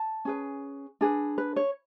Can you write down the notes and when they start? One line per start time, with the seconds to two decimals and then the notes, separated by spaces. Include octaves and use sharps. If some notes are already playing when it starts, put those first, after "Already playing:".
Already playing: A5
0.25 C#4 G#4 B4
1.01 D4 G#4 B4
1.38 B4
1.56 C#5